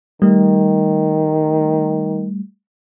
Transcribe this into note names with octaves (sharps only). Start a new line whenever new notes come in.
D#3 G3 A3